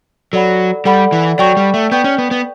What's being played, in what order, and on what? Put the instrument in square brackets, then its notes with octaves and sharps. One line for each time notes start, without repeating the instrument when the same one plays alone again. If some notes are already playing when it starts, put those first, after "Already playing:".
[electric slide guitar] F#3 [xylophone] A4 D5 F#5 B5
[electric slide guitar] G3 [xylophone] A4 D5 F#5 B5
[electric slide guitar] E3
[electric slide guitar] F#3 [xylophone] D5 G5 C#6 G6
[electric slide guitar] G3
A3
[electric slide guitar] B3 [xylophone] D5 G5 C#6 G6
[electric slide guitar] C#4
B3
B3